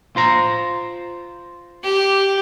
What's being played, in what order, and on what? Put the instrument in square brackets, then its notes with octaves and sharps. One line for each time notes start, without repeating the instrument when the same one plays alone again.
[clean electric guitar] F4 C5 A#5
[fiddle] G4